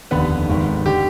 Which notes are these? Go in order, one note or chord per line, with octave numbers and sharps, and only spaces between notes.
F1 D#2 D3 B3 B4
G#1 G#2 D#3
D3 G4